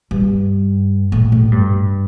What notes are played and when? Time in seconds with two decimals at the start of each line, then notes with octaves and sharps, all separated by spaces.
0.11 G2
1.12 A2
1.32 A2
1.52 G2